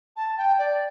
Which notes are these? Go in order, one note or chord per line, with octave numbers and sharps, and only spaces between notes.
A5
G5
D5